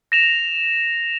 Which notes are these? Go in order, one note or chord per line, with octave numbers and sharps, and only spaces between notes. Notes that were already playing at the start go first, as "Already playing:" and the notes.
A#6 E7 F7